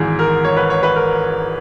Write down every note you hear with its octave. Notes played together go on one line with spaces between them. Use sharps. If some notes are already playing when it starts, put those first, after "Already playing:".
Already playing: G#1 G#2 E3 G#4
A#4
C#5
B4
C#5
B4
A#4